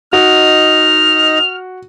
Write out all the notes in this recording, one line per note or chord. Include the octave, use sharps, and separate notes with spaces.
D#4 F#4 D#5 F6